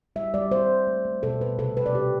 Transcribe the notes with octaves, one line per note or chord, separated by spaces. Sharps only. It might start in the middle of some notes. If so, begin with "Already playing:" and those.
G3 E5
G3 D5
G3 C5
G3
A3
A3
B2 A4
B2 B4
C3 A4
G3 B4
D5
C3 G4